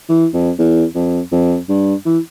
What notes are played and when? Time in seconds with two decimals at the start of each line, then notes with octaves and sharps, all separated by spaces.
0.09 E3
0.33 F2
0.58 E2
0.95 F2
1.32 F2
1.69 G2
2.05 E3